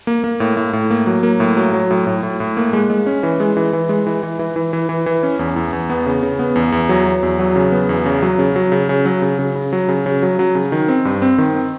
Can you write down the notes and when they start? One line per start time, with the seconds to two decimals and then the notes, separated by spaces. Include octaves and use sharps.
0.07 A#3
0.24 A#3
0.40 A2
0.57 A2
0.73 A2
0.90 A#3
1.07 F#3
1.23 A#3
1.40 A2
1.57 F#3
1.73 F#3
1.91 A2
2.07 A2
2.23 A2
2.40 A2
2.57 A#3
2.73 G#3
2.90 G#3
3.06 C#4
3.23 E3
3.40 G#3
3.57 E3
3.73 E3
3.89 G#3
4.07 E3
4.23 E3
4.39 E3
4.56 E3
4.73 E3
4.89 E3
5.06 E3
5.23 C#4
5.39 E2
5.56 E2
5.73 E2
5.89 B3
6.06 C#3
6.23 C#3
6.39 B3
6.56 E2
6.72 E2
6.89 F#3
7.06 F#3
7.23 E2
7.39 F#3
7.56 C#3
7.72 B3
7.89 E2
8.06 C#3
8.22 F#3
8.39 C#3
8.56 F#3
8.72 C#3
8.89 C#3
9.06 F#3
9.22 C#3
9.39 C#3
9.55 C#3
9.73 F#3
9.89 C#3
10.06 C#3
10.23 F#3
10.39 F#3
10.55 C#3
10.72 D#3
10.88 C4
11.05 G2
11.22 C4
11.38 D#3
11.55 C4